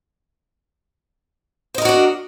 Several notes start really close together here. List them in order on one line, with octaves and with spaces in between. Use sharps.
C5 D#5 A#4 F#4 D4